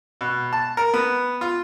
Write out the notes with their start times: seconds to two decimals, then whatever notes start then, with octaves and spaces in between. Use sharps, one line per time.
0.21 B2
0.53 A5
0.77 A#4
0.94 B3
1.41 F4